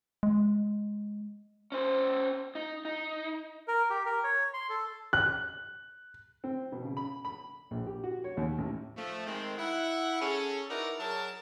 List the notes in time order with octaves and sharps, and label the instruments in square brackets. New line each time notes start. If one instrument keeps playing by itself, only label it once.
[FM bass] G#3
[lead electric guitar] C#4 C5
D#4
D#4
[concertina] A#4
G4
A#4
C#5
C6
A4
[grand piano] F#6
[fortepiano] C4
B2
C#3
B5
B5
A#1
G4
F#4
C#5
D#2
A1
[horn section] F3 A3
D#3 G#3 C4
E4 F#5
C#4 G#4 A4
D#4 E4 F#4 A#4 B4 D5
F#3 G#4 A#4 C#5 A5